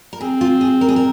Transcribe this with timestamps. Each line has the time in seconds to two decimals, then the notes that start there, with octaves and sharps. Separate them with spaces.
0.13 A#4
0.21 C4 G#4
0.41 F4
0.61 G#4
0.81 A#4
0.89 G#4
0.96 A#4